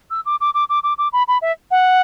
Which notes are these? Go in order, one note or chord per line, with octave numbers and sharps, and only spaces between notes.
E6
D6
D6
D6
D6
D6
D6
B5
B5
E5
F#5